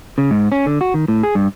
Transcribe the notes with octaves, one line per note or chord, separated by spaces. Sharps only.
C#3
G#2
C#4
D3
F#4
D#3
A2
G#4
G2